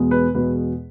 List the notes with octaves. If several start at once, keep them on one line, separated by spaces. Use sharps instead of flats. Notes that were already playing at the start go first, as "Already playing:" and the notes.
Already playing: E2 B2 G#3 B3
B4
E2 B2 G#3 B3 B4